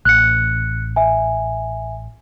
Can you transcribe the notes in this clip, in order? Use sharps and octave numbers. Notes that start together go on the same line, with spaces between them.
A1 F#6 C#7
E5 G#5